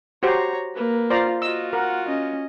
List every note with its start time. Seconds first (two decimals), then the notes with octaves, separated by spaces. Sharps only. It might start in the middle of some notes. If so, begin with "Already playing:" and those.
0.23 F#4 G4 C5 C#5 A#5
0.76 A#3 B4
1.10 F4 C5 D5 F5 A#5
1.42 F4 F#4 D#5 E6
1.73 A#4 F#5
2.07 C#4 D#5